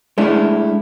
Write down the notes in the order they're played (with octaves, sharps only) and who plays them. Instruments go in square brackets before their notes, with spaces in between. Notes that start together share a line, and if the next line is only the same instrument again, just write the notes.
[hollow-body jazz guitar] G#3 A3 D4 E4